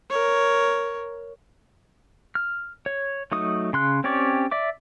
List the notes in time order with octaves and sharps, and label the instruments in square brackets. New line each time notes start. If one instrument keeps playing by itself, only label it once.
[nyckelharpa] A#4 C#5
[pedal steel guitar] F6
C#5
F#3 A3 D#4 D#6
C#3 C6 F#6
C4 C#4 G4 C#5 D5
D5 E5 D6